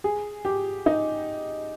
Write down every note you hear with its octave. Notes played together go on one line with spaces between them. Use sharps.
G#4
G4
D#4